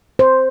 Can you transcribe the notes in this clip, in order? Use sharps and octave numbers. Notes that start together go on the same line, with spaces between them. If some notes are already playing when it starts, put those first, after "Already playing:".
C5